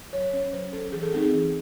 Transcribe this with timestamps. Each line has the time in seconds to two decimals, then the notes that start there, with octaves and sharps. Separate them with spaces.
0.13 F#3 C#5
0.33 C#4 C#5
0.53 F#3 C5
0.73 C#4 A4
0.92 E3 G#4
1.03 A4
1.12 A3 C4 D#4 G#4
1.32 E3